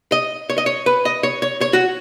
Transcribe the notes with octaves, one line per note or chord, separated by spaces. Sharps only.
D#5
C#5
D#5
C#5
B4
D#5
C#5
C#5
C#5
F#4